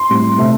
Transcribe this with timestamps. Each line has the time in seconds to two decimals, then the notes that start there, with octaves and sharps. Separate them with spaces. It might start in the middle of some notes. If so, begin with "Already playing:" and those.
Already playing: C6
0.09 A2 G3 C4
0.38 C3 A3 C4